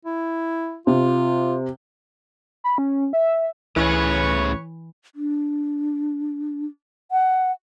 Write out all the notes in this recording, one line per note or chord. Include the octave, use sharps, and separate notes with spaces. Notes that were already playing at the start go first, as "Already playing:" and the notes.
E4
C3 F4
B5
C#4
E5
C#2 A2 E3 C#4 G#4 B4 C#5
D4
F#5